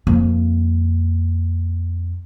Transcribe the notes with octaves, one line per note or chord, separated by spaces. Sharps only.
F2 A#3